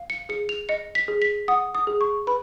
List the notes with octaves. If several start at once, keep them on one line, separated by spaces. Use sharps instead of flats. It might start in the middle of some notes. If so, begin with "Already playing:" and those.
Already playing: F5
C#7
G#4 C#7
F7
D#5 C#7
B6
G#4
B6
F#5 D#6
D#6
G#4
C#6
B4 B5